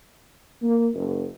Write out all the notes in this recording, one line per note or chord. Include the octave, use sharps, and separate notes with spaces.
A#3
F#1